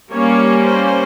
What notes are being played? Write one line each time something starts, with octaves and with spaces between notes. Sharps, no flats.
G3 A#3 C#4 C#5
C5